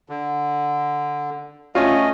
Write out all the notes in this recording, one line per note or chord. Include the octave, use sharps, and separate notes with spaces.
D3
A3 C#4 F4 D#5